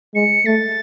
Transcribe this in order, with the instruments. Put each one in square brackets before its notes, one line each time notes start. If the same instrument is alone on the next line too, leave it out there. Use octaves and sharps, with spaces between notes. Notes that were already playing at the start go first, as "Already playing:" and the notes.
[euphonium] G#3 [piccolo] C#7
[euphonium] A3 [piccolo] A6